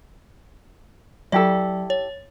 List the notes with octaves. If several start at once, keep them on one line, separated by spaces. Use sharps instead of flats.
F#3 E4 G4 A4 D5
C#5